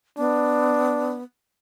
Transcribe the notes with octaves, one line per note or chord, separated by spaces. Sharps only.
B3 D4